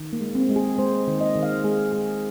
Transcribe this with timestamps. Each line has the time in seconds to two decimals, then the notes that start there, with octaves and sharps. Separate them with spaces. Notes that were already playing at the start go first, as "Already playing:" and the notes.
Already playing: D#3
0.13 A#3
0.21 G#3
0.35 C4
0.49 G#3
0.56 G#4
0.78 G#3 C5
1.07 D#3
1.21 D#5
1.36 D#3
1.43 F5
1.64 G#3 G#4
1.92 G#3 G#4